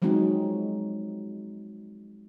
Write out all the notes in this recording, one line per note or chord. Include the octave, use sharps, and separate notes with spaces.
F3 F#3 G#3 C4 D#4 F#4